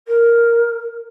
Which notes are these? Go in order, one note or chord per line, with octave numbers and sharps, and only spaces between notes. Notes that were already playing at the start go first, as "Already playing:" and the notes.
A#4